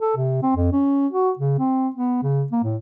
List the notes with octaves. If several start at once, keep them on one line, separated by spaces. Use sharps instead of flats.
A4
C3
C4
F2
C#4
F#4
C#3
C4
B3
C#3
A#3
A2